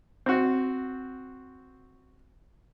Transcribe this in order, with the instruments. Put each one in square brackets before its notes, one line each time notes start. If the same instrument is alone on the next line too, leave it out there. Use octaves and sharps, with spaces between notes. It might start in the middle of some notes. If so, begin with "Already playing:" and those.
[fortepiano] C4 F#4